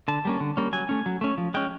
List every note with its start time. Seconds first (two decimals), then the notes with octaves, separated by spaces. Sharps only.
0.08 D3 A5
0.25 G3 A#3 C#4
0.40 D3
0.57 G3 A#3 C#4
0.73 F#3 G#5
0.89 A3 C#4
1.06 F#3
1.21 A3 C#4
1.38 F3
1.54 G#3 C#4 G5